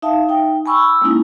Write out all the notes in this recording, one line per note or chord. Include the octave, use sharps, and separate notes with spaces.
D#4 E5 F5 A5
D#4 G5
G#5 B5 C#6 E6
E6
G#3 A#3 C#4 D#4 E4